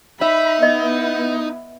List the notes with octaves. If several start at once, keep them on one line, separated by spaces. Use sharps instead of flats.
D#4 E5 B5
B3 E4 D#5